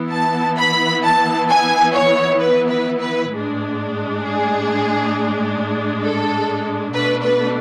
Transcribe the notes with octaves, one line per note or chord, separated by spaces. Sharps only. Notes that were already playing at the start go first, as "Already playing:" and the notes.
Already playing: E3 B3 E4
A5
B5
A5
G#5
C#5
B4
B4
B4
A2 G#3 D4
G#4
A4
B2 A3 D4 B4
B4